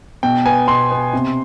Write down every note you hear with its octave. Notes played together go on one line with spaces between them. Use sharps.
B2 G5
B3 G#5
B2 C6
B3
C3